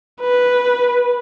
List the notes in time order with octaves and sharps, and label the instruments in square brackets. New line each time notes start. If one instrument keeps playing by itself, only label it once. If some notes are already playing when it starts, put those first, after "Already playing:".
[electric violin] B4